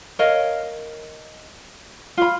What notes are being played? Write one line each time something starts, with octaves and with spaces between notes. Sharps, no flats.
A#4 C#5 D#5 F5
F4 B5